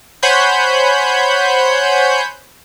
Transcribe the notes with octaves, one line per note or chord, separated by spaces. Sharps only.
C5 C#5 F#5 G#5 B5 G6